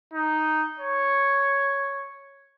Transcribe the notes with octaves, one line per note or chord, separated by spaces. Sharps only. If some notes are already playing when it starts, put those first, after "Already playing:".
D#4
C#5